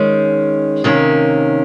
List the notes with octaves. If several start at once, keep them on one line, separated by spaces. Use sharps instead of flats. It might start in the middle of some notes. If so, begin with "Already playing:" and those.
Already playing: D#3 G#3 C#4
C3 D#3 A#3 C#4